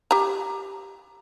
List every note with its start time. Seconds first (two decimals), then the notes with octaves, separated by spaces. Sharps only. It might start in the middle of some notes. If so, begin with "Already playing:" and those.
0.11 G4 A#5